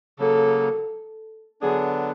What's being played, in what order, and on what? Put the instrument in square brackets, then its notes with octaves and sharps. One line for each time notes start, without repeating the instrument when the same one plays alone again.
[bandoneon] C#3 F#3 A#3 [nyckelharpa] A4
[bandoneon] D3 F#3 B3 D4 [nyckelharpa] G#4